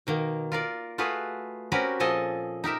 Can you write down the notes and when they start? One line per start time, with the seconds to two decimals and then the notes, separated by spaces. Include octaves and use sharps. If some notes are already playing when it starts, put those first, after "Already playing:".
0.07 B2 D#3 A#3
0.52 F4 A#4 D5
0.98 A3 F4 F#4 G#4 B4
1.72 C4 C#4 F#4 G4 A#4 B4
2.00 A#2 F3 G#4 A4 D#5 G#5
2.64 D#4 G4 A#4 E5